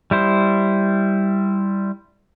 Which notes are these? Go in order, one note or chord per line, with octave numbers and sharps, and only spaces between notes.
G3 E4 C5